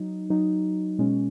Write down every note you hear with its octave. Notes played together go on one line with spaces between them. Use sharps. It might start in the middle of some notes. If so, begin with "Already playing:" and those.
Already playing: F#3 D#4
F#3 D#4
B2 G#3 C#4